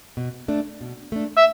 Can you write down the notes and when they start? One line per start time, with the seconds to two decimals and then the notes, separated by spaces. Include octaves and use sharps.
0.17 B2
0.48 A3 D4
0.81 B2
1.12 A3 D4
1.38 E5